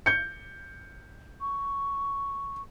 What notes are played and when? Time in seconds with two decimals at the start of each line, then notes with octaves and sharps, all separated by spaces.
0.06 G6 C#7
1.41 C#6